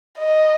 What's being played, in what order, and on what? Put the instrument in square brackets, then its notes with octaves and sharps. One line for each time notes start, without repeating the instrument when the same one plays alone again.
[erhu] D#5